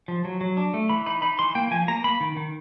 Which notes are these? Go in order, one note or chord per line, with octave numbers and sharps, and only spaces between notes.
F3
F#3
F#3
D4
A3
E3 B5
D#4 B5
D#4 B5
E3 C6
A#3 G5
F3 G#5
A#3 A#5
A#3 B5
D#3
D#3